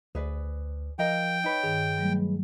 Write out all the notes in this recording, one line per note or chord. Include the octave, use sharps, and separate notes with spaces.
D2 G#4 B4 D5
F3 A#4 D#5 F5 G5
D#4 B4 C#5
G2 D#3 G#4
F#3 G3 A3